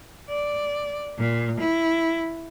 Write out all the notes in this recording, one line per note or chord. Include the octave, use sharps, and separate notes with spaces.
D5
A#2
E4